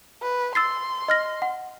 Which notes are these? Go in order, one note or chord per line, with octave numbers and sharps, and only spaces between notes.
B4
C6 E6 A6 C7
D#5 F6 A#6
F#5